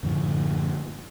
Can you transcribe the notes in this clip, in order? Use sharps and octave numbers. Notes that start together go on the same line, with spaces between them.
F#2 A2 D3 F3